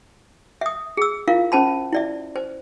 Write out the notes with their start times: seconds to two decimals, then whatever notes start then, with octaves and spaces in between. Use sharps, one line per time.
0.61 E5 D#6
0.97 G#4 E6
1.28 E4 F4 A#4 F5
1.52 C#4 C5 A5 B5
1.93 E4 D5 E5
2.36 C5